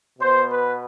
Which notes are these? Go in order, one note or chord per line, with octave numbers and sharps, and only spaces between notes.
B2 B3 C5
B4